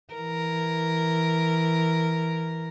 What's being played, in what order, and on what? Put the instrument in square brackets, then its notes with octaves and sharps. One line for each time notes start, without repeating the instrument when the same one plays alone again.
[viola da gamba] E3 A#4